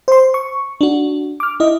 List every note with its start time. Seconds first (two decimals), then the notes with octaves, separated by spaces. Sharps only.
0.08 C5 C6
0.34 C#6
0.81 D4 F#4
1.40 D6 F6
1.60 E4 D#5